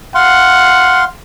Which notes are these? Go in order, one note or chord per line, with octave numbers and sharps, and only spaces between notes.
F5 F#5 C6